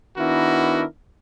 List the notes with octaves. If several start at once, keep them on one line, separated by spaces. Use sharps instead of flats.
D#3 B3 D4 E4 F#4 A#4